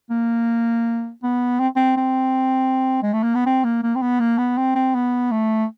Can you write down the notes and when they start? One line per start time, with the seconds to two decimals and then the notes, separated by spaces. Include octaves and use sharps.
0.11 A#3
1.23 B3
1.60 C4
1.76 C4
1.97 C4
3.03 G#3
3.14 A3
3.23 A#3
3.35 B3
3.46 C4
3.65 A#3
3.83 A#3
3.96 C4
4.02 B3
4.20 A#3
4.38 B3
4.58 C4
4.76 C4
4.95 B3
5.32 A3